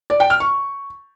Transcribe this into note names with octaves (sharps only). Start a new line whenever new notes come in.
D5
G5
F6
C#6